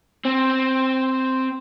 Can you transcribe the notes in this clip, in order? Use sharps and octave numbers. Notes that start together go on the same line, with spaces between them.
C4